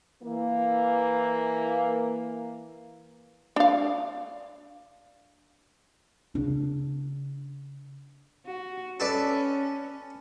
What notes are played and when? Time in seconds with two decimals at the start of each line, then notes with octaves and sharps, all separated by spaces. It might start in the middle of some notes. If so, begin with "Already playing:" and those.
0.22 E3 A#3
3.56 D4 F5
6.35 C#3 D4
8.47 F#4
9.00 C#4 A4 B4 D5